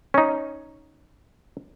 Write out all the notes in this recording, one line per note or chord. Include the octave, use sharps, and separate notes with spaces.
C#4 D#4